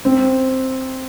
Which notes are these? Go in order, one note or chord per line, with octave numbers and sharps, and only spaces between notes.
C4